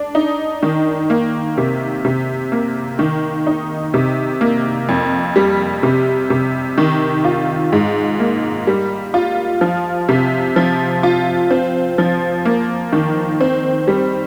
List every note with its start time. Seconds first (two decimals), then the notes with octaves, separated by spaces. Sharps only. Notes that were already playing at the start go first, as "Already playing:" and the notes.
Already playing: D4
0.15 D#4
0.63 D#3
1.10 A#3
1.58 C3
2.05 C3
2.52 A#3
2.99 D#3
3.47 D#4
3.94 C3
4.41 A#3
4.89 F2
5.36 G3
5.83 C3
6.30 C3
6.78 D#3
7.25 F4
7.72 G#2
8.20 A#3
8.67 G3
9.14 F4
9.61 F3
10.09 C3
10.56 F3
11.03 F4
11.51 C4
11.98 F3
12.45 A#3
12.93 D#3
13.41 C4
13.88 G3